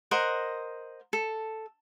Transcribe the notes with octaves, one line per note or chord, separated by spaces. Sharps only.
A#4 C5 D#5 F#5
A4